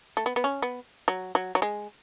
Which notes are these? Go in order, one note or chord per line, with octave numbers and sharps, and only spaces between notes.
A3
B3
B3
C#4
B3
F#3
F#3
F#3
G#3